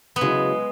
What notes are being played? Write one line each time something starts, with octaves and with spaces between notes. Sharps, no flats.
B3
C#3 F#3 G#3 E4